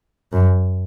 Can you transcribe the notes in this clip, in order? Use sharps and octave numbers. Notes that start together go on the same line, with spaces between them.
F#2